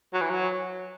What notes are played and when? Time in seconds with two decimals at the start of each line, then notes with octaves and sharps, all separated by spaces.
0.14 F#3
0.21 E3
0.30 F#3